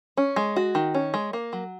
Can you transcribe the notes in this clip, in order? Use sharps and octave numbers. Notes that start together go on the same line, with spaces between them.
C#4
G#3
F#4
D#3
C#4
G#3
A#3
F#3